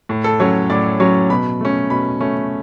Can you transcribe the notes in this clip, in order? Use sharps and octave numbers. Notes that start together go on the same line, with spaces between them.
A2
A4
F#3 C#4 C#5
A2 D5
F#3 C#4 C#6
B2 B5
A3 C#4
B2 B5
A3 C#4